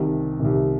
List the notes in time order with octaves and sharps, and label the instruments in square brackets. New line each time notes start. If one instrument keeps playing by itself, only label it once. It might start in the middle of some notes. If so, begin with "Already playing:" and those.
Already playing: [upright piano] C2 C3 D#3
C2 C3 D#3